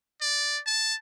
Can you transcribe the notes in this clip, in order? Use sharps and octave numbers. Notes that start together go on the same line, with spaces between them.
D5
A5